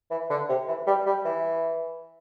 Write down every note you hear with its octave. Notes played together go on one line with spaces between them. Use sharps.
E3
D3
C3
E3
G3
G3
E3